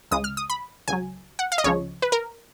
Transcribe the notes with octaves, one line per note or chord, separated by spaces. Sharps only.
C#2 C#3 G#3 D#6
F6
D#6
B5
C#2 C#3 F#3 G#5
F#5
F5
D#5
C#2 C#3 F3 C#5
B4
A#4